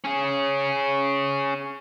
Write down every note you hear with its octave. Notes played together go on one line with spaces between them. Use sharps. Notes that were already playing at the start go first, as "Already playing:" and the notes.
C#4 G#4